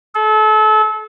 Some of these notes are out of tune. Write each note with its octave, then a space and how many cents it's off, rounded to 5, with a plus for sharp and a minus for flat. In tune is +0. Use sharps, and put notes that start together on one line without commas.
A4 -30